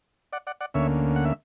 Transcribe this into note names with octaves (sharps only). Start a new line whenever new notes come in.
D5 F#5
D5 F#5
D5 F#5
D2 D3 A#3 C#4 C#5 E5
F#5
E5